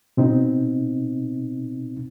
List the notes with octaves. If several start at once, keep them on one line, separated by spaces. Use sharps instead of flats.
B2 C4 D#4